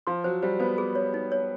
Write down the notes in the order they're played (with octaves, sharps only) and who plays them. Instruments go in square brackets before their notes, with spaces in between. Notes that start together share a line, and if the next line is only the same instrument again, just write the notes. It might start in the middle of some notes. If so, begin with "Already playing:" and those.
[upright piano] F3 [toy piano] C6
[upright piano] F#3 [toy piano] C5
[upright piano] G3 [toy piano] C5
[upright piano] B3 [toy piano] C5
[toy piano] G#4
C#5
D#4
C#5